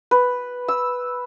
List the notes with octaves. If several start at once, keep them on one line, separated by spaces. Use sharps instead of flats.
B4
E6